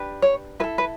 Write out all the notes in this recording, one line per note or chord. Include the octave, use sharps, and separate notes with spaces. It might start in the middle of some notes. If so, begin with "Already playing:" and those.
Already playing: D4 G4 B4
C#5
E4 A4 B4
B4